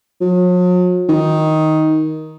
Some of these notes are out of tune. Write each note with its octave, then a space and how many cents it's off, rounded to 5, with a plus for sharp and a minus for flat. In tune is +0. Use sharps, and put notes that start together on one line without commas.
F#3 -45
D#3 +10